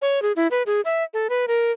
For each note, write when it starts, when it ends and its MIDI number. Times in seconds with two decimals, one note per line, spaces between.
0.02 0.22 73
0.22 0.32 68
0.36 0.47 64
0.51 0.63 71
0.66 0.81 68
0.85 1.03 76
1.14 1.27 69
1.30 1.46 71
1.48 1.71 70